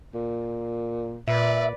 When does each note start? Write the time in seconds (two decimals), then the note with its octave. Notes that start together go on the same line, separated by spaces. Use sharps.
0.14 A#2
1.28 A#2 B4 D5 E5